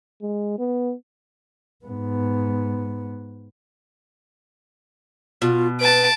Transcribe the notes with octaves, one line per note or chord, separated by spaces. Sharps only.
G#3
B3
G#2 B3
B2 F4
B4 A5 D7